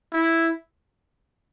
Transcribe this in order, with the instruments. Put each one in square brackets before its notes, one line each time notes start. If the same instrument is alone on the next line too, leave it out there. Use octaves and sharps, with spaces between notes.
[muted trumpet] E4